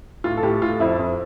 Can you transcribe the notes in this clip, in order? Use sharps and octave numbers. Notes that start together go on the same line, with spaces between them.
A2 F4
A4
A2 G4
A2 F4
F2 E4
F2